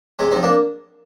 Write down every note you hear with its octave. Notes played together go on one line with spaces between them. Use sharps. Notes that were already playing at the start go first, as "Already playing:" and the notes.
C3 G#3 C4
F3 C4 D#4
A#3 D4